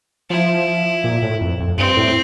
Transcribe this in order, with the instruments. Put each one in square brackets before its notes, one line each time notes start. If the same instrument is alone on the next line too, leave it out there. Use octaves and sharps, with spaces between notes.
[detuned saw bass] F3 [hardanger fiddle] E4
[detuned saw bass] A#2
A2
F2
F2
[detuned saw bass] G2 [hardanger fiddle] C4
[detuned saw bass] A2